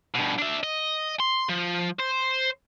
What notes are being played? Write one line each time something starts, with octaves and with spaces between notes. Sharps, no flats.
G2 B2
D4 E5
D#5
C6
F3
C5